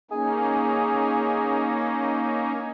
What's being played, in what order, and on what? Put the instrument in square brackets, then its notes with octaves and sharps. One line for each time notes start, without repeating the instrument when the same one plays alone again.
[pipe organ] A#3 C#4 D#4 [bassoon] G#4